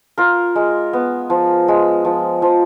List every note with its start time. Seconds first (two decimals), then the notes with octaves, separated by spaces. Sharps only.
0.18 F4 A#4
0.56 G#3
0.93 B3
1.30 F3
1.68 G#3
2.05 F3
2.42 F3